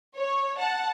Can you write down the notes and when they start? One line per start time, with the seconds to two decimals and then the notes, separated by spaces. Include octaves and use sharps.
0.16 C#5
0.59 F#5 A5